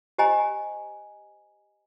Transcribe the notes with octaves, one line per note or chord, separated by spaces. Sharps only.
G4 C5 D#5 G#5 A#5